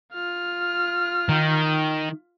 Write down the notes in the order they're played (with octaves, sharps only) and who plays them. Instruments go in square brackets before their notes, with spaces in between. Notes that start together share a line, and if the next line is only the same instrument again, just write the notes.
[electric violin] F4 F6
[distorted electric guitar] D#3